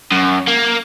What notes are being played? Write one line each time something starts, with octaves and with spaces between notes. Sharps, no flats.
F#2
A#3